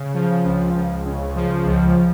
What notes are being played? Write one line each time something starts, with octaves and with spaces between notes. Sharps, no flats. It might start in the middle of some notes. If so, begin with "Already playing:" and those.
Already playing: C#3
F3
C#2
C#2
C#3
F3
C#2